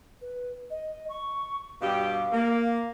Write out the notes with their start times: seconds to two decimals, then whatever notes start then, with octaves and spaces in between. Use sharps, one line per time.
0.21 B4
0.70 D#5
1.09 C#6
1.81 G2 B2 G4 F5
2.32 A#3